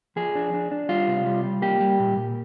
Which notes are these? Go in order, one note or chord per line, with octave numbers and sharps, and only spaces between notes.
F3 G#4
D4
D4
D4
G3 F4
C3
G3
G3
A#3 G4
G3
A#2
A#2